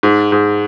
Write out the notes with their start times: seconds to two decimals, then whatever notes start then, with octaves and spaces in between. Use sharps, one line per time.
0.03 G#2
0.32 G#2